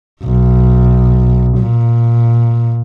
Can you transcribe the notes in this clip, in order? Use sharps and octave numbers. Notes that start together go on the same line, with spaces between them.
B1
A#2